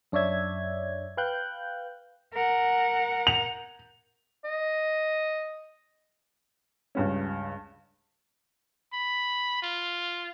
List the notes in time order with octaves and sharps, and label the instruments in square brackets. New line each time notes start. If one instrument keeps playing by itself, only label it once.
[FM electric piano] F#2 D4 C#5 D5 E5 G#6
B4 F5 G5 F#6 G6
[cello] A#4 F#5
[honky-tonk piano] F7
[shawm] D#5
[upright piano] C#2 G2 C#4
[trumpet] B5
F4